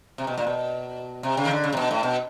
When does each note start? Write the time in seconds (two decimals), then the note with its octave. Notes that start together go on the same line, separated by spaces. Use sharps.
0.18 C3
0.27 B2
0.37 A#2
0.47 B2
1.23 C3
1.37 C#3
1.45 D#3
1.51 D3
1.64 C#3
1.73 C3
1.77 B2
1.91 A2
2.03 B2